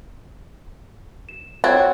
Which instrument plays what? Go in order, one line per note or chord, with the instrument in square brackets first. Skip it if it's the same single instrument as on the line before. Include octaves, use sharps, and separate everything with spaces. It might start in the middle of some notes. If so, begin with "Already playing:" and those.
[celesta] E7
[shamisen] C4 [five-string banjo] F#4 [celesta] C#5 G#6 A6